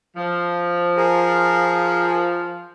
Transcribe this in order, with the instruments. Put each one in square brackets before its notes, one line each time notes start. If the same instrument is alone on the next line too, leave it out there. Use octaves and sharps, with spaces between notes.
[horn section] F3
[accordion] G#4 A#4